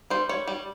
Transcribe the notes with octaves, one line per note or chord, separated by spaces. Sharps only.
G3 C5
G3 C#5
G3